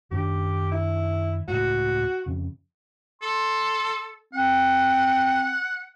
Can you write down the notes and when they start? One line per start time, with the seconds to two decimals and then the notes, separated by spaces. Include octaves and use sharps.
0.11 F#2 D#3 D4 G4
0.72 E4
1.48 C#2 A2 F#4
2.26 F2 C#3
3.22 A4 C6
4.34 C4 F#5